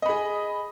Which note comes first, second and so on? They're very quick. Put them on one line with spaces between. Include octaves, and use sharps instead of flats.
D#5 B5 G#4